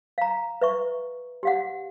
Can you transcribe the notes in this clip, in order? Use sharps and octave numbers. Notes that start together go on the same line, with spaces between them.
F5 A#5
B4 E5 C#6
G4 F5 F#5